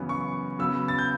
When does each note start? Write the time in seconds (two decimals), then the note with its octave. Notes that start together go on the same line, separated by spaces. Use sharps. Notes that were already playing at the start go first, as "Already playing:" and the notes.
Already playing: F#2 C#3 E3 B3
0.09 C#6
0.59 C#3 F#3 B3 E6
0.88 A6
0.98 G6